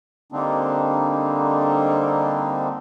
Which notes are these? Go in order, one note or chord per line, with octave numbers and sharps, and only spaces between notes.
D3 G3 A#3 C4 D4 D#4